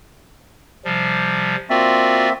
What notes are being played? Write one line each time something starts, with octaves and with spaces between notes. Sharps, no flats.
C3 F3 G3
A#3 C4 F4 F#4 D5 E5